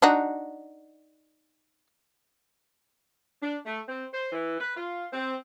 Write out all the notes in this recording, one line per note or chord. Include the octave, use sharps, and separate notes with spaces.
D4 D#4 F#4
D4
A3
C4
C5
E3
B4
F4
C4